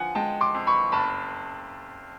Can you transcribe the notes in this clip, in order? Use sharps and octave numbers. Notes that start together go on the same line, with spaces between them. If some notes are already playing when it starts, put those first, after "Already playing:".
Already playing: D3 F3 F#5 G#5
G#3 G5 A5
C6 D6
F2
B5 C#6
F#1 A5 B5